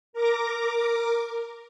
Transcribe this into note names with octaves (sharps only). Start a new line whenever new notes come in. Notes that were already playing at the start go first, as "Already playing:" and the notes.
A#4 D6 A#6